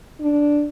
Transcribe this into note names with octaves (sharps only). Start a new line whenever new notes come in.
D4